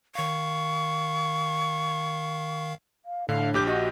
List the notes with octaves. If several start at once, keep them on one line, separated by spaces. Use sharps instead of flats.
D#3 F5 C#6
F5
A2 D3 D4 F5
A#1 G4 D6 G6
F#4 D#5